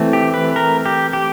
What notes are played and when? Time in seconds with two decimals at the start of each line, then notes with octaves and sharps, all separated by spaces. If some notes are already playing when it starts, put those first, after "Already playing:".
Already playing: E3 A3 C4
0.13 G4
0.34 B4
0.56 A#4
0.86 G4
1.13 G4